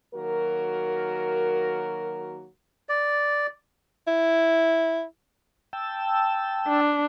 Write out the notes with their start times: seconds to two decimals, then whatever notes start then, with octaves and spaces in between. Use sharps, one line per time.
0.15 D#3 F#3 A#3 F#4 A#4
2.89 D5
4.07 E4
5.73 G5 A5 E6
6.67 D4